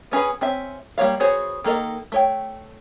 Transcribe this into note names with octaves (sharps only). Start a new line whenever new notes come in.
B3 C#4 G#4 B4
C4 C#4 E5
G3 A#3 C#5 F5
B3 F#4 G#4 C5 C#5
D#3 A#3 A4 A#4 D#5
A3 C#5 G5